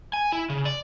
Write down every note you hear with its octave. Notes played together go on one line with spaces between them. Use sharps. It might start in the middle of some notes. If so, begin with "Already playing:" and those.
G#5
E4
C#3
D5